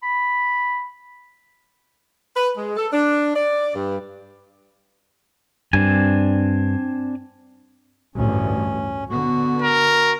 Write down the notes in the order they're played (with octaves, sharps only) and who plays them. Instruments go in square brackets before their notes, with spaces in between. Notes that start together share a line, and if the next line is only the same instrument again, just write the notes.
[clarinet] B5
[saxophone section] B4
G#3
A4
D4
D5
G2
[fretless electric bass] G2 [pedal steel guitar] C4 D4 G#5
[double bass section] A1 D2 G2 [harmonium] C#4
[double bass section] D3 B3 [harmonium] F#4
[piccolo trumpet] A#4